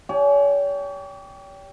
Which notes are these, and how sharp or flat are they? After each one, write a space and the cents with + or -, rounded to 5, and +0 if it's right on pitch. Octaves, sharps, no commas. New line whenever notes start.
G4 +0 C#5 +40 G#5 +25